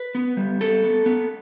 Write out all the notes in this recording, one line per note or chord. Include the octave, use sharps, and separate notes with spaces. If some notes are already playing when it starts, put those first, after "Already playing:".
Already playing: B4
B3
G3
B3 A4
B3
B3